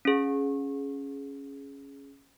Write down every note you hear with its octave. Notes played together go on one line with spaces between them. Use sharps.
C#4 G#4